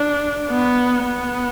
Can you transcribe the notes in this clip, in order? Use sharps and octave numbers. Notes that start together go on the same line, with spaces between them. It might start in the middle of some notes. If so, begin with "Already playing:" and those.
Already playing: D4
B3
B3